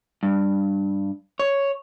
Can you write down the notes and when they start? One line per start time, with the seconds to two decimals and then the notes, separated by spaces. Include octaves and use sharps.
0.23 G2
1.40 C#5